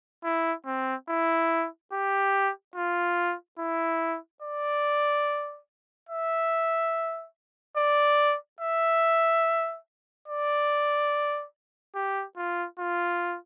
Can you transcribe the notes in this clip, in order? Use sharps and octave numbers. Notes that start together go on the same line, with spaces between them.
E4
C4
E4
G4
F4
E4
D5
E5
D5
E5
D5
G4
F4
F4